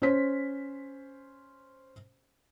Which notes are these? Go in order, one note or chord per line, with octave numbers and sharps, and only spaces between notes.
C#4 C5 B6